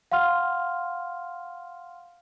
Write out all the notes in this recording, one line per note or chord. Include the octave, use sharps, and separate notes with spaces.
F5 F#5 C6 F6